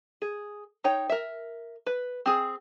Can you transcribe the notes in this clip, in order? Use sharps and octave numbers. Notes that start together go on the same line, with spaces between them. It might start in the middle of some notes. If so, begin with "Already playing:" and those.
G#4
D#4 C#5 G5
A#4 E5
B4
C4 G#4